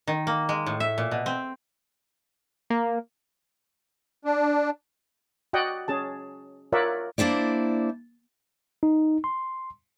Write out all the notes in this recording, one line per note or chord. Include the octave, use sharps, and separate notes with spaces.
D#3
A#3
G#3
A2
E5
A#2
B2
C4
A#3
D4
F#4 D5 D#5 F#5 G5
C#4 G#4 A5
F4 A#4 C#5 D5 E5 F#5
A#3 D4 E4 C5 D5
D#4
C6